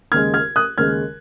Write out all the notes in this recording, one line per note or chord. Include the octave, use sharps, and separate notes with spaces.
D#2 C#3 G#3 F6 G#6
F6 G#6
D#6 F#6
D#2 C#3 G#3 F6 G#6